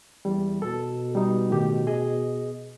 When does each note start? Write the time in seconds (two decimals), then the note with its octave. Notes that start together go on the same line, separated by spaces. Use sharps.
0.25 E2 G3
0.62 B2 A4
1.15 G3 D#4
1.50 A2 D#3 G4
1.87 G#4 D#5